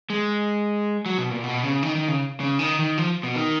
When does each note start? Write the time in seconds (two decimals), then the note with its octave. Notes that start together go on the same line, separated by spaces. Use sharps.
0.10 G#3
1.06 F#3
1.18 B2
1.31 A#2
1.44 B2
1.63 C#3
1.83 D#3
1.95 D#3
2.08 C#3
2.40 C#3
2.59 D#3
2.79 D#3
2.98 F3
3.23 B2
3.36 D#3